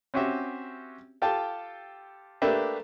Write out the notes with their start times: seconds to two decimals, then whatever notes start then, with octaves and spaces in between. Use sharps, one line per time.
0.14 C4 C#4 F#4 G4 E5
1.22 F4 G4 A4 G5 A5
2.42 A3 A#3 D4 G4 B4 E5